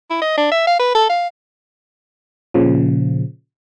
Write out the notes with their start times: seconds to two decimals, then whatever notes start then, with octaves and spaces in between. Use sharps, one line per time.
0.10 E4
0.22 D#5
0.37 D4
0.51 E5
0.67 F5
0.79 B4
0.95 A4
1.10 F5
2.54 A#2 C#3 F3